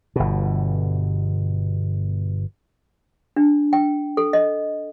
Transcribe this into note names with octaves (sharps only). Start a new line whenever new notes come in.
G1 B2
D4
G5
A4
D#5